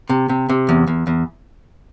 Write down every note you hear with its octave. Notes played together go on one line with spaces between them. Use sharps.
C3
C3
C3
E2
E2
E2